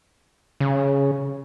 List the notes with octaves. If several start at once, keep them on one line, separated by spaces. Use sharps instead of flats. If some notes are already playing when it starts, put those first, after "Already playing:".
C#3